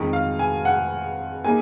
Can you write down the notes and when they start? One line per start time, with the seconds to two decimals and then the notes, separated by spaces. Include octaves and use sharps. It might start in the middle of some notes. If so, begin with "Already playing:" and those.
Already playing: F2 D#3 G#3 D#4
0.13 F5
0.39 G#5
0.65 F#5
1.44 A#3 D#4 G#4 G#5